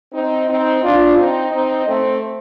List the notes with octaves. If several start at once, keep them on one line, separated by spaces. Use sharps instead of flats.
C4 D#4
C4 D#4
D4 F4
C4 D#4
C4 D#4
A3 C4